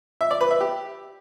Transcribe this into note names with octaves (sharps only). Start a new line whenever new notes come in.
E5
D5
B4
E5
G4